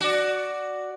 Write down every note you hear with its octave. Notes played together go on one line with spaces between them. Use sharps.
F#4 D5